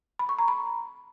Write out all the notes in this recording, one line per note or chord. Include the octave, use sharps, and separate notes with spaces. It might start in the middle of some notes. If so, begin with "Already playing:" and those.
B5
C#6
A#5
B5